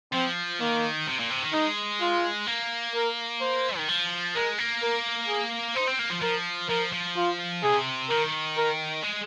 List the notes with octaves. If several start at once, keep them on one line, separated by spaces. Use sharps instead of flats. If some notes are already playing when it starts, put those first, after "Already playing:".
F3 C4
D#3 A#3
C3
A#2
C3
D#3
G#3 D#4
F4
A#3
A#4
C5
D#3
F3
G#3 A#4
A#3
A#4
G#4
D#4 C5
C4
A#3
F3
F3 A#4
F3 A#4
F3
F4
C3 G#4
D#3 A#4
A#4
G#3